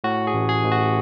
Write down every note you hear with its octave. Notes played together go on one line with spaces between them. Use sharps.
A2 F#4
G#4
A1
G#4
A1
F#4